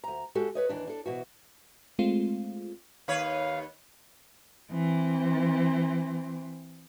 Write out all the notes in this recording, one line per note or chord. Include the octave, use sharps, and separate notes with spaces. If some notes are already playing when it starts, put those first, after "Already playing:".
D2 A#5
G#3 F#4 G4 A4
B4 C#5 D#5
D#2 E3 D4
D4 A4
B2 E3 F#4
G#3 A3 C4 F4
D#2 B4 C#5 F5
E3 C4